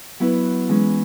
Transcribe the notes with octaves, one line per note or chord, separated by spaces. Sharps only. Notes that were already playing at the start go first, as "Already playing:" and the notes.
F#3 B3 E4 B4
E3 G#3 C#4